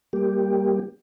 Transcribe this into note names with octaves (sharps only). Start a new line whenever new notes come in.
G3 A#3 G4